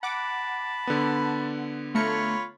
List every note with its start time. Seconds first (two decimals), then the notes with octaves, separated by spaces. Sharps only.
0.03 F#5 A5 B5 D6
0.87 D3 B3
1.95 A3 F4 C#5 A#5 B5 C#7